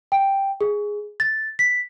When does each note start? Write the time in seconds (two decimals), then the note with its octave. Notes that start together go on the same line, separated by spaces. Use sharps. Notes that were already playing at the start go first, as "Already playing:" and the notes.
0.12 G5
0.61 G#4
1.20 A6
1.59 B6